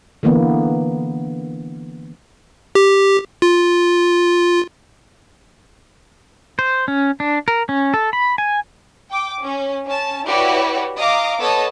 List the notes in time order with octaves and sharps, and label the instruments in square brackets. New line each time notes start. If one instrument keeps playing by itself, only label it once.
[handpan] D3 E3 A#3 B3
[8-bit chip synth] G4
F4
[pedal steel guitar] C5
C#4
D4
A#4
C#4
A4
B5
G#5
[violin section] G5 D6
C#4
C#4 A5
E4 F#4 G4 B4 C#5 D5
D#5 F5 A#5 D6
B3 A4 C#5 D#5 A5